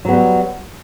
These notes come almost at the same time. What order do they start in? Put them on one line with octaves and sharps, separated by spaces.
F#3 B3 G3